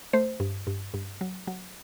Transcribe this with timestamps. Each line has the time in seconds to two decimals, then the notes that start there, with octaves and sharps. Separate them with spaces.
0.13 A3 C5
0.40 G2
0.67 G2
0.94 G2
1.21 F#3
1.47 F#3